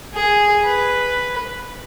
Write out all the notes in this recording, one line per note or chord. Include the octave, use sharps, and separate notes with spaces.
G#4
B4